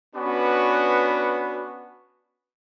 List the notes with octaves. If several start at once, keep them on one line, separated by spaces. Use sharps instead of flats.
B3 C#4 D4 F#4 B4